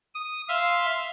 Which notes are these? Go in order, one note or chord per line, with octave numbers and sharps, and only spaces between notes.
D#6
E5 F5 C6